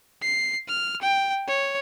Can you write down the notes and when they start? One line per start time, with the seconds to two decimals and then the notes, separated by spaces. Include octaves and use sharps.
0.22 C7
0.68 F6
1.02 G5
1.48 C#5